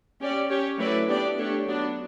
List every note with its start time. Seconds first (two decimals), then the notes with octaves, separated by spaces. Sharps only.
0.21 C#4 G4 D5
0.49 C#4 G4 C#5
0.78 F#3 A3 E4 B4 D5
1.07 B3 D4 G4 D5
1.37 A3 D4 G4 C#5
1.66 F#3 B3 D4